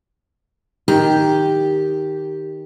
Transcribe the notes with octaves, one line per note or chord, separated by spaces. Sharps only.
D#3 G4